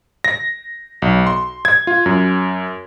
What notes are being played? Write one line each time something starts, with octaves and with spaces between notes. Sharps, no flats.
A#6
B1
C6
G#6
F4
F#2